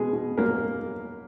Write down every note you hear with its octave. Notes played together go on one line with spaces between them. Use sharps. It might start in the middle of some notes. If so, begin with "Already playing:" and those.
Already playing: B2 G#3 G#4
B2
F#3 A#3 A#4